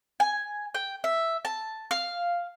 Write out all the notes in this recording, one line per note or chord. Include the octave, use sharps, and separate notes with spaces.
G#5
G5
E5
A5
F5